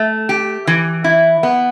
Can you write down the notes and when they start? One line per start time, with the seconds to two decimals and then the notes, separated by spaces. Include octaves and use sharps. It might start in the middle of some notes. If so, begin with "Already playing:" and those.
Already playing: A3
0.29 G4
0.67 E3
1.04 E4
1.43 B3